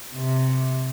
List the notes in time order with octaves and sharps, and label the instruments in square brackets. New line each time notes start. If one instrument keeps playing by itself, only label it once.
[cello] C3